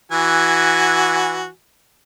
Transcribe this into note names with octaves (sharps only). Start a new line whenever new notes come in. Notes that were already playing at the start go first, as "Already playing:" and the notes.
E3 F#4 G#5